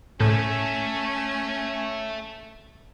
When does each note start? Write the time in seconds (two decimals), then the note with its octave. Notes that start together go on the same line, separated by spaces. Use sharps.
0.20 A2 A3 C#4 A4